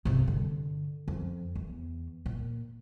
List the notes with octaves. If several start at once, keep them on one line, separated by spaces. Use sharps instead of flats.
G2 C3
D3
F2
E2
A#2